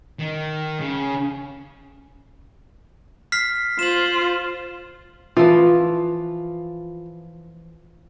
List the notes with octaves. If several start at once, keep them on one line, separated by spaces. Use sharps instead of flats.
D#3
C#3
F6 B6 C7
F4 C5 E7 F#7
E3 F3 F4 B4